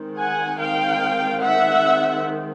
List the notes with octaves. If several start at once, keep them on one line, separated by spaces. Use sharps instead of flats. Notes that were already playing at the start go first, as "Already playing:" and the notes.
Already playing: D#3 G#3 C4
F#5 G#5
F5 G5
E5 F#5